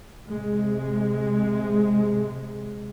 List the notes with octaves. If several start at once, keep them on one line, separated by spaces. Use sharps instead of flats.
C3 G#3